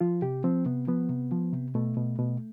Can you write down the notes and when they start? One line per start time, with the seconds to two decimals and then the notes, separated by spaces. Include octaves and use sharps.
0.01 F3 F4
0.22 C3 G4
0.44 F3 C4
0.66 C3 B3
0.87 F3 B3
1.09 C3
1.32 F3
1.52 C3
1.75 B2 A3
1.97 B2
2.19 B2